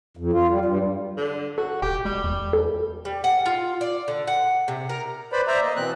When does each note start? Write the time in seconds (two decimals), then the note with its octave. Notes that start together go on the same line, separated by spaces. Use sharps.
0.17 F2
0.33 F4
0.49 G3
0.65 G2
1.17 D3
1.58 F#4 A4
1.82 E1 G4 G5
2.05 G3 G#3
2.24 E2
2.53 A4
3.05 G3
3.24 F#5
3.46 F4
3.81 D5
4.08 D3
4.28 F#5
4.68 C3
4.89 A#4
5.32 B4 C5 D5 B5
5.47 C5 D5 E5 A#5
5.62 A#3 D#5
5.76 B2 E3 C4 F#6